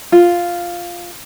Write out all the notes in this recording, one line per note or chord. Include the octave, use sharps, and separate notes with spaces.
F4